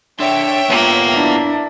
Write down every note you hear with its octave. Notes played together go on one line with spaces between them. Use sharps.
D4 C#5 E5 G5 C6
A#3 B3 F4
D4 E4